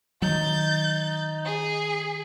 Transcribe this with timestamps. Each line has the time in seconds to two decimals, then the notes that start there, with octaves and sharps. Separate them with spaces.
0.22 D#3 F#3 D#4 G6 A6
1.45 G#4